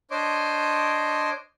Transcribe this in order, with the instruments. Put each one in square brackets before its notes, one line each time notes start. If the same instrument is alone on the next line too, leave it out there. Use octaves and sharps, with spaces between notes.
[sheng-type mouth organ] D4 C5 C#5 D#5 C6 D6